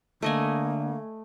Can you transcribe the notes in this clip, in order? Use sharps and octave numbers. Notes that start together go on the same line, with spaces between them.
D3 A3 A#3 D#5 G#5